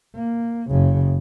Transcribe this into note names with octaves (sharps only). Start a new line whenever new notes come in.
A#3
F#1 C#3